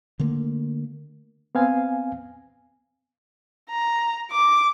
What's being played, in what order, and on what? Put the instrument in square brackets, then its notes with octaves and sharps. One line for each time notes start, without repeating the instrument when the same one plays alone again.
[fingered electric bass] D3 A3 A#3
[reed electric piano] B3 C4 F5 G#5
[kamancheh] A#5
D6